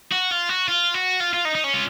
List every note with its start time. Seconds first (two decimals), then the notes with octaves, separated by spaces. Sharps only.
0.12 F#4
0.31 F4
0.49 F#4
0.68 F4
0.94 F#4
1.20 F4
1.33 F4
1.45 D#4
1.55 D#4
1.64 C#4
1.74 F4